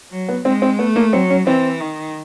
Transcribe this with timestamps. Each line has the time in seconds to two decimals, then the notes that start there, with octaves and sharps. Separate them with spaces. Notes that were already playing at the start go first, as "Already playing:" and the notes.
0.11 F#3
0.29 B3
0.45 G#3 C4
0.62 C4
0.79 A3 B3
0.96 A#3
1.13 F#3 C4
1.30 C#4
1.47 E3 C4
1.81 D#3